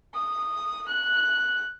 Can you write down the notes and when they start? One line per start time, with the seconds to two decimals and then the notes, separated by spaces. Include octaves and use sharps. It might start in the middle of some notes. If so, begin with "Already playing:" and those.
0.15 D#6
0.88 F#6